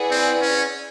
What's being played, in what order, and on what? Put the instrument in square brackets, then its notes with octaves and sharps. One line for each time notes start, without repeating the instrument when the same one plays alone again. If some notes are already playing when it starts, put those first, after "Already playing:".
Already playing: [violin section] E4 G#4 B4 D5 F#5
[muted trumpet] C4
C#4